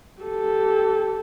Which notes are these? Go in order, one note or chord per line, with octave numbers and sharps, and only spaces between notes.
G4 A4